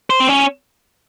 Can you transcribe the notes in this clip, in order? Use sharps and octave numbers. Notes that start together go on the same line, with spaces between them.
C5
C4
C#4